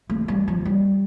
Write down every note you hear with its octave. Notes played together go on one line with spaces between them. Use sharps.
A3
G3
F3
G3